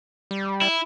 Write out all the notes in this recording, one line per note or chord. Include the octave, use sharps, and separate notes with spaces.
G3
E4